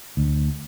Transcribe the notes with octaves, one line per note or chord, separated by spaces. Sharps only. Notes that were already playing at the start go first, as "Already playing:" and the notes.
D2